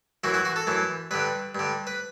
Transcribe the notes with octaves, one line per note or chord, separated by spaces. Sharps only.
F#2 E3 F#4
F#4
F#4
A4
F#2 E3
G2 D3 B4
G2 D3
B4